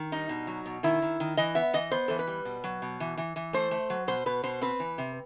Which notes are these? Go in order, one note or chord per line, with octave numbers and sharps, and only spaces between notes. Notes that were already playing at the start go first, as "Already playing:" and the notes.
Already playing: D#3
G3 D#4
B2
F#3
B2
D#3 E4
D#3
D#3
E3 D#5
B3 E5
E3 D#5
B3 C5
E3 A4
B4
G3
B2
F#3
B2
E3
E3
E3
A3 C5
A3
F#3
B2 C5
B2 B4
B2 C5
C4 B4
E3
C3